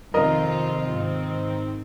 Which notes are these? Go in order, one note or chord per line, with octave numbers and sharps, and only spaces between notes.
F2 C3 D#3 C4 F4 A#4 D#5
G#2 D#3 C4